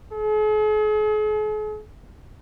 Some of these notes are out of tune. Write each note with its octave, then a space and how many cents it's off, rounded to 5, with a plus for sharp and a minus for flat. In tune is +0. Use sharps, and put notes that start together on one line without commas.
G#4 +45